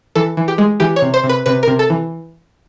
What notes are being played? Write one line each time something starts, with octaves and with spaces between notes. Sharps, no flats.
E3 A4
E3
G4
G#3
E3 G4
C#5
C3
C5
C3
B4
C3 B4
C3 A#4
A4
E3